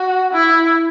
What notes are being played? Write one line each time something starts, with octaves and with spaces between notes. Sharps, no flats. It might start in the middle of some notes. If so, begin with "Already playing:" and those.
Already playing: F#4
E4